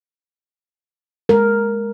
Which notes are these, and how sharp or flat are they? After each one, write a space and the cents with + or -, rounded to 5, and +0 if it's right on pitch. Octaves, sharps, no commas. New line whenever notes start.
G#3 +0 A#4 +0